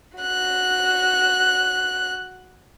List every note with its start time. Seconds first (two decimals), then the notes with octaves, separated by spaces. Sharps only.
0.18 F#4 F#6